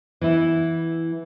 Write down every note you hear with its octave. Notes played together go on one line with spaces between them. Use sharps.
E3 B3 E4